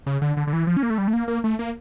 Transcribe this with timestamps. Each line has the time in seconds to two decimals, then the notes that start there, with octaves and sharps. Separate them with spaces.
0.07 C#3
0.22 D3
0.37 D3
0.47 D3
0.53 E3
0.67 F3
0.77 C#4
0.83 A#3
0.90 A3
0.98 G3
1.08 A3
1.13 A#3
1.28 A#3
1.44 A3
1.59 A#3